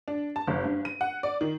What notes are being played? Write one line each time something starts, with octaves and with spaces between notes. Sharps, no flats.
D4
A5
F#1
G2
D#7
F#5
D5
D#3